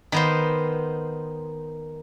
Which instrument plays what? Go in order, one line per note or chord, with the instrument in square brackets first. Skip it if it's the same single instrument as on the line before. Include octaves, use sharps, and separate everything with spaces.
[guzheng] D#3 B3 C5